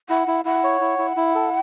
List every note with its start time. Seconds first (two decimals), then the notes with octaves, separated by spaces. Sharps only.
0.09 E4 F#5
0.28 E4
0.45 E4 F#5
0.64 C#5
0.81 E4
0.99 E4
1.17 E4
1.35 A4